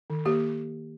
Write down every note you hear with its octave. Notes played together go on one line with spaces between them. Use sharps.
D#3
A#3 G4